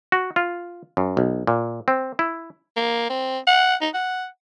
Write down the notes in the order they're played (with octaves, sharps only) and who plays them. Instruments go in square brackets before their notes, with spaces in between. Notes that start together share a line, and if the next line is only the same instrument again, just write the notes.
[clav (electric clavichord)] F#4
F4
F#2
B1
A#2
C4
E4
[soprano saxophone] A#3
C4
F#5
D#4
F#5